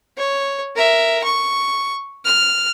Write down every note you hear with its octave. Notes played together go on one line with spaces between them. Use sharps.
C#5
A#4 E5
C#6
F6